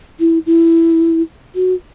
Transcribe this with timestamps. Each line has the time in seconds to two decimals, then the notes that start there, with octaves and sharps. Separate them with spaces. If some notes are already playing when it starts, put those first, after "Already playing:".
0.20 E4
0.46 E4
1.55 F#4